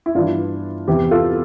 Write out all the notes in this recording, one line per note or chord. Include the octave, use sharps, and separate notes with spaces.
E4
G2 E3 D4 F4
E2 C3 E3 E4 G4
F4 A4